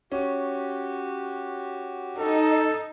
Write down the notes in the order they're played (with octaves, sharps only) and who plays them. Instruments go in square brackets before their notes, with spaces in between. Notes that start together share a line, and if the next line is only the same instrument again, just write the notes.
[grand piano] C#4 [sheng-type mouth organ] F#4 G4
[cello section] D#4 [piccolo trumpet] A4